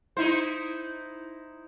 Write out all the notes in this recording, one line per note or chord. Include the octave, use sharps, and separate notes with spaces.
D#4 E4 C5